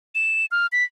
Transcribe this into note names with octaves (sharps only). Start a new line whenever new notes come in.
E7
F6
B6